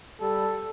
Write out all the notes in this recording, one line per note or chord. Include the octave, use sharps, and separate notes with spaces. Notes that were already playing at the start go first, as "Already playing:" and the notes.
G3 A4